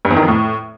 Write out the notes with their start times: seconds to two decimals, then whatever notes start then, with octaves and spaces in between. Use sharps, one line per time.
0.05 G2
0.11 E2
0.16 D#3
0.22 F2
0.28 A2